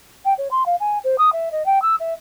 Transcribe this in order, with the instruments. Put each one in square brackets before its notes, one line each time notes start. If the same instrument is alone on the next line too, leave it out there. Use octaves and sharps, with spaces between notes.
[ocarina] G5
C#5
C6
F5
G#5
C5
D#6
E5
D#5
G5
E6
E5